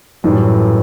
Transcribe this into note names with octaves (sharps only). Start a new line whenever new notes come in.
F#2 A2 E3 G3